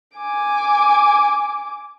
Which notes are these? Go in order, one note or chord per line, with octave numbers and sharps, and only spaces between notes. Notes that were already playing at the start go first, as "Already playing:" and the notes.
G#5 D6